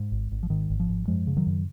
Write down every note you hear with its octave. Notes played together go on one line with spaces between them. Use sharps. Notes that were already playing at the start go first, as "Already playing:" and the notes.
Already playing: G#2
G#1
G#1
F3
G#2 D#3
G#1
F3
G#2
F#2 F3 G#3
C#3
D#3 F#3
F#2